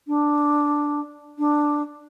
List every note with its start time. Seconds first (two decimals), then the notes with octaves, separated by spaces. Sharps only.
0.08 D4
1.39 D4